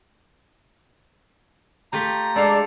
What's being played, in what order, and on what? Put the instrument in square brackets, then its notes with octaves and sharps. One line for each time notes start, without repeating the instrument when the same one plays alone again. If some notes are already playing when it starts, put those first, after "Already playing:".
[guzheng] A3 F4 G4 [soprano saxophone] A#5
[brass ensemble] G#3 D5 [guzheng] D4 F5 [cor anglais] A4